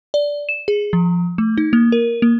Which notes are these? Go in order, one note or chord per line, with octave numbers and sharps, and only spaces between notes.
D5
E7
G#4
F3
A3
D#4
A#3
A#4
A#3